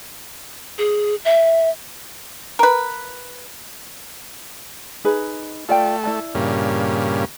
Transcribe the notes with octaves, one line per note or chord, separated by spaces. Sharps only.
G#4
E5
A#4 B4
D#4 G#4 B4
A3 F4 D5 G5
E4 D5 A5
G2 A#2 C#3